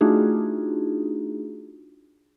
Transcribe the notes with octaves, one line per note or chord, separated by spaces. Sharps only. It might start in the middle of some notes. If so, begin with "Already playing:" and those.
A3 D4 D#4 F4 F#4 G#4